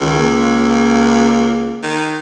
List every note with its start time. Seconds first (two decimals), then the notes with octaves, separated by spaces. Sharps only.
0.01 C#2 D#3
0.19 A#3
1.83 D#3